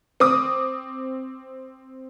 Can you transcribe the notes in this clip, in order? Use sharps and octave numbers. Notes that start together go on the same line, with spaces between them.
C4 D6 D#6